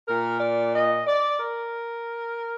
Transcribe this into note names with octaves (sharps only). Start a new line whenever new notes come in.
A#2 A#4
D5
D#5
D5
A#4